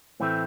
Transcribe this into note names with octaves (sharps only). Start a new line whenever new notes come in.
A2 E3 A3 C4